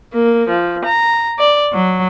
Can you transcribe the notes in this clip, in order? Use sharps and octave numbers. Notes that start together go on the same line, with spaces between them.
A#3
F3
A#5
D5
F#3